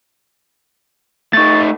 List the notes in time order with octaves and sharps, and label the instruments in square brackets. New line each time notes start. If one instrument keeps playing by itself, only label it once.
[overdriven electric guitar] A3 D#4 [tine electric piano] C#6 A6